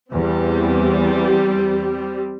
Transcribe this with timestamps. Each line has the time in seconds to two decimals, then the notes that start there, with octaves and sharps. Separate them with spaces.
0.12 E2 G3 C4